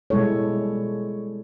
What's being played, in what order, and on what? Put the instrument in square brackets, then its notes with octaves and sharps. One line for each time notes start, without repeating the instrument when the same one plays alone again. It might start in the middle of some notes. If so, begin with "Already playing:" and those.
[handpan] B2 G3 G#3 E4 A4 C#5